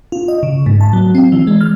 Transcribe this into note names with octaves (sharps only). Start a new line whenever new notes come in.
F4
D#5
C#3
G#2
A5
F#3
C4
E3
G#3
F6